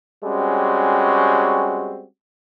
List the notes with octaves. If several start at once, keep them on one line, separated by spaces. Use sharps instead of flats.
G3 G#3 C4 C#4 F#4